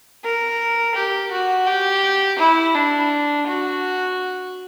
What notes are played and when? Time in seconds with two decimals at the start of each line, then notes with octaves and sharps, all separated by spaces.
0.24 A#4
0.95 G4
1.31 F#4
1.67 G4
2.39 E4
2.75 D4
3.47 F#4